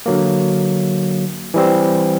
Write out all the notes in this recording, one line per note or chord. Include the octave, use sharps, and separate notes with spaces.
D3 F#3 A#3
E3 G3 C4